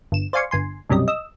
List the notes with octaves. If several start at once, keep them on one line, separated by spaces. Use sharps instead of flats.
G1 E7
C5 D5 F5 G#5 C6 C#6
G1 G#5 C6
B1 F#2 C3 G3 D#5
D#5 E6